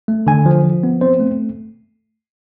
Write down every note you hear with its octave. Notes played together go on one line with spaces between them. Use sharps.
A3
D3 G#5
F3
F3
B3
C4 C5
A3